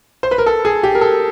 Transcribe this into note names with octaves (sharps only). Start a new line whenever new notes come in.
C5
B4
A#4
A4
G#4
G4
A#4
A4